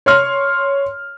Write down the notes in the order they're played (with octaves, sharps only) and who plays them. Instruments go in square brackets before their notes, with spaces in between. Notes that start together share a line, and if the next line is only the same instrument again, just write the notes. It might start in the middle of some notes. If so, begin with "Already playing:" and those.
[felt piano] C#5 C6 F6